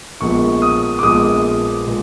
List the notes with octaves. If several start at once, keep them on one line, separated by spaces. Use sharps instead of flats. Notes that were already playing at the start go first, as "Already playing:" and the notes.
A#1 A#2 F3 G#3 B3 C#6
D#6
D6
A#1 A#2 F3 G#3 B3 D#6
A#2 G#3